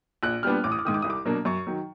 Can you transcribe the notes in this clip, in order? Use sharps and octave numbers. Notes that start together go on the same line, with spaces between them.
A#1 F#6
A#2 G3 B3 D4 F6
A1 D6
D#6
D6
G#2 D#3 D#6
D6
C2 D#6
D6
B2 F#3 A#3 D4
F#2 C#6
D#3 F#3